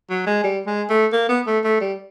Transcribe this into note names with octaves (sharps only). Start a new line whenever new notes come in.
F#3
G#3
G3
G#3
A3
A#3
B3
A3
A3
G3